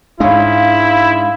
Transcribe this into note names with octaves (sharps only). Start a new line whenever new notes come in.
G#2 G#3 D4 E4 C#5 F5